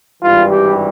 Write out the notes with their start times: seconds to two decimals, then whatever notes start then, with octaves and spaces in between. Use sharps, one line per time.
0.23 G#1 G2 E3 G3 F4
0.51 G4